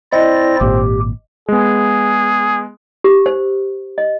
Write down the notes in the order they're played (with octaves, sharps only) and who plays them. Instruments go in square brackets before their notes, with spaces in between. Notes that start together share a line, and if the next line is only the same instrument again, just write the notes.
[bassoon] C4 [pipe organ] E4 D5 A#6 [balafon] D#5
[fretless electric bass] G#1 A#2 [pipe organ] G4
[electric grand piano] G#3 B3 [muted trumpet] G#4
[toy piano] G4
C5
D#5